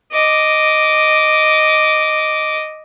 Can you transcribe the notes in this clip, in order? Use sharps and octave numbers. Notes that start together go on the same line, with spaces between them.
D#5 D6